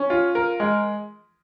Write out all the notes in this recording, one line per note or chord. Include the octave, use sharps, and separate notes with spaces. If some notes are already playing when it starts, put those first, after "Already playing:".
Already playing: C#4
F4
A#4
G#3